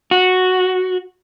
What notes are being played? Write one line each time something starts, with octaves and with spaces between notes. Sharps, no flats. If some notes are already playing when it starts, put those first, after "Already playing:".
F#4